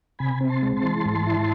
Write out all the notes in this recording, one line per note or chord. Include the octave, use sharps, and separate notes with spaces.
C3 G#5 B5
C4
A5 C6
G#3
A5 C6
E3
G#2
E4